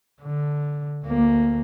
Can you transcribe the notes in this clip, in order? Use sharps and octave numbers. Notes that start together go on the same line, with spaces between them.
D3
D2 A#3